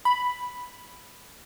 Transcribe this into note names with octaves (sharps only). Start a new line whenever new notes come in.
B5